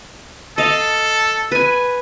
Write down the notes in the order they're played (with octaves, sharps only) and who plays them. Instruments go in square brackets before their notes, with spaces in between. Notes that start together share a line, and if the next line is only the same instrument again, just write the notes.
[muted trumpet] A4 [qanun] D#5 F5
[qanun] B4 G#5